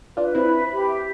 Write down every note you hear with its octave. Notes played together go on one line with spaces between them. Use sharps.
D4 F4 B4
C4 E4 B5
E5
G4
E5